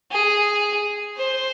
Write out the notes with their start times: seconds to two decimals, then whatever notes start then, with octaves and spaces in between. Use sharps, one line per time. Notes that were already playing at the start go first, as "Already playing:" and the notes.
0.12 G#4
1.17 C5